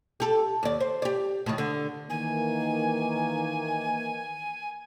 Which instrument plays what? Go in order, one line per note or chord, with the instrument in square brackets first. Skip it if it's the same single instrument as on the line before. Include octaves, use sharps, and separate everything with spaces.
[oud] G4 A4
D#2 D5
C5
G4 D5
A2 D#3
D3
[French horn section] D#3 E3 A#3 [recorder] G#5